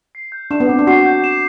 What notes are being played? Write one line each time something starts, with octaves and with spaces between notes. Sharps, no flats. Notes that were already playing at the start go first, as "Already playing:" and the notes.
C7
G6
D4 E7
B3
C4 D6
D4
F#4 C7
G6
E7